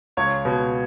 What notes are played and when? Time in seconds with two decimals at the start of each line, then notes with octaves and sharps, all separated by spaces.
0.17 C#2 C#5
0.45 B2